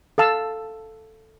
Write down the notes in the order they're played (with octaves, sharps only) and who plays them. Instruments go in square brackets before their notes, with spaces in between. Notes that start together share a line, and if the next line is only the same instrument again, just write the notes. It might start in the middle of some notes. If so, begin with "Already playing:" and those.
[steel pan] A4 F5 A5 E6